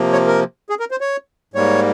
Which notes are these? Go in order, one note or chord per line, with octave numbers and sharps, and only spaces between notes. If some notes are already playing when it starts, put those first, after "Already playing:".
Already playing: C3 F3 A#3
C#5
A#4
G#4
A#4
C5
C#5
G#2 G3 A#3 C#5